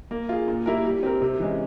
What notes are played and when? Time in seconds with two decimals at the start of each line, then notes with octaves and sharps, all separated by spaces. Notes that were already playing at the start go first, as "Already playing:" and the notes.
0.11 A#3
0.29 F4 G#4
0.48 A#2
0.66 G3 A#3 E4 A#4
0.85 G3
1.03 C4 G4 A#4
1.21 C3
1.39 E3 G#3 C#4